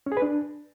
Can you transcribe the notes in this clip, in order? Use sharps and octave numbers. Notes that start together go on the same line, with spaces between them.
C#4
G#4
B4
D4